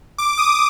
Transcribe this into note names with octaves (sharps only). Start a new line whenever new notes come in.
D6
D#6